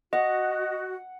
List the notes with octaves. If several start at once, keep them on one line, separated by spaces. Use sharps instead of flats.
F#4 D#5 F#5